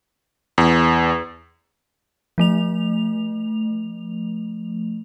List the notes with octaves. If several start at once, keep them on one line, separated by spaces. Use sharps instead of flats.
E2
F3 A3 F7